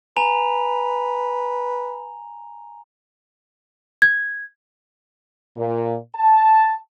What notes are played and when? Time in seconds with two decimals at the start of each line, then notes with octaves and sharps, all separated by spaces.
0.17 B4 G#5 A#5 F7
4.02 G#6
5.57 A#2
6.15 A5